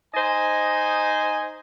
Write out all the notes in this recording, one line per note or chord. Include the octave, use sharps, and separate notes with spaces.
D#4 C5 D#5 G#5